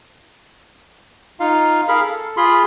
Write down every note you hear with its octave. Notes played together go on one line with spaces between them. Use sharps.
D#4 F4 F5
G#4 A#4 F5 B5
A4
F4 G#4 B5 C6